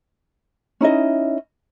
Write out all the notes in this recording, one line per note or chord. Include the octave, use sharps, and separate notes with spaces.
C#4 D#4 E4 D#5